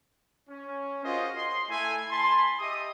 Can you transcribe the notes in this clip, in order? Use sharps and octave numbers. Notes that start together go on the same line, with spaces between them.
C#4
F4 F#4 G#4 A#4 C5 D#5
C6
A3 E4 G#5
G#5 A5 B5 C6
G4 D#5 E5 D#6